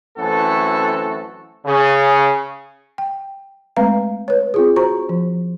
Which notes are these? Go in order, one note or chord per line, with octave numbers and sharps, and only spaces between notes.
F#2 E3 A3 C4 F#4 A4
C#3
G5
G#3 A3 C4 B4 F5 A#5
B4 C#5
C4 F4 G#4
F#4 C5 A#5 C#6
F3